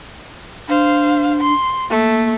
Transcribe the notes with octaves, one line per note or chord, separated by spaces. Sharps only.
D4 C5 F5
C6
A3 A#3